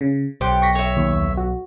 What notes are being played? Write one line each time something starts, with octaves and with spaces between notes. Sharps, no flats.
C#3
B1 G4 C5 F#5
C#6 A#6 B6
C#5 E5
D#2
F#4